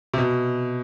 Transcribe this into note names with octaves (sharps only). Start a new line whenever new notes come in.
C3
B2